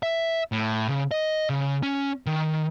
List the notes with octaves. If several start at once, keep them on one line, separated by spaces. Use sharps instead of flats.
E5
A2
C#3
D#5
C#3
C#4
D#3